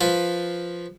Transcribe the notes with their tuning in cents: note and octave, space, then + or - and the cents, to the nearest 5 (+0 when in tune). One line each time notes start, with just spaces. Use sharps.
F3 +0 F4 +0 B4 +0